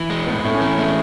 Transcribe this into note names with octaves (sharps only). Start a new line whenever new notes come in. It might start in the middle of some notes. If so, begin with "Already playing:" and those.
Already playing: E3
G#3
A2 B3
A2 A3
C#4
E3 B3
G#3 A3